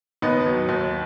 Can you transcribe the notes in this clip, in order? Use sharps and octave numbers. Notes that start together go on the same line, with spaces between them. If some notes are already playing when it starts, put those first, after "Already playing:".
D#2 B3 D#4
F#3
D#2